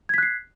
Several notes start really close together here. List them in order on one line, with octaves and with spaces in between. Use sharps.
G#6 B6 F#6 C7